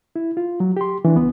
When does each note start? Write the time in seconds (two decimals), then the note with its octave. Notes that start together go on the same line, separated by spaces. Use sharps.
0.16 E4
0.37 F4
0.60 F#3
0.77 G4 C6
1.05 E3 D4
1.16 C#2 B3